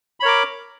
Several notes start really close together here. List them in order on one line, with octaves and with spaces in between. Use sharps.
B5 C#5 A#4 D6